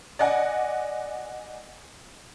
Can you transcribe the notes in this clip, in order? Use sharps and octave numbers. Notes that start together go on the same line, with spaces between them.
D5 D#5 F#5 G#5